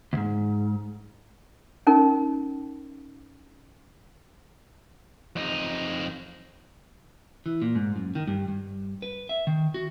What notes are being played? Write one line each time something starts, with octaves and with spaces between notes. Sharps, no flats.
D2 G#2
C#4 D#4 A#4
F2 D#4
E3
A#2
G#2
F#2
D#3
G2
G2
B4
E5
D#3
F#4